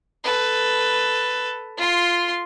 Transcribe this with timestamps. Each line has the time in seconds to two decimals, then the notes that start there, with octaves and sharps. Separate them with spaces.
0.24 A4 B4
1.77 F4 C6